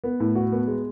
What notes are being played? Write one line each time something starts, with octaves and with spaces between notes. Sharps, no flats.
B3
A2
F#4
B3
G#3